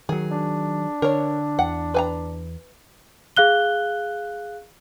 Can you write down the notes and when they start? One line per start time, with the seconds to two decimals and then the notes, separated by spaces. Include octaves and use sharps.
0.09 D#3 F#3 G#4
0.31 D4
1.02 D3 A#4 C#5
1.59 E2 F#5
1.94 B4 G#5 A#5
3.37 G#4 F5 F#6 G7